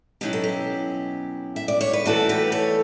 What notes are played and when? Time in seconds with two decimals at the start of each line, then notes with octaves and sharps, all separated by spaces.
0.21 B2 F#3 C#4 E4 G4
0.33 A4
0.44 G4
1.56 E5
1.68 D5
1.81 C#5
1.93 B4
2.06 E3 A3 E4 F#4 A4
2.29 G4 B4
2.52 A4 C#5